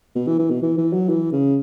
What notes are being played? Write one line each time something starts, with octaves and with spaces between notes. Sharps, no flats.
B2
E3
E3
B2
E3
E3
F#3
E3
C#3